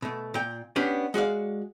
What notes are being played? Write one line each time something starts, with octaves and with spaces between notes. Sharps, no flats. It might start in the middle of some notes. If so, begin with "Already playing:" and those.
B2 A3
A#2 G5
B3 C#4 D4 G4
G#3 F#4 D5 F5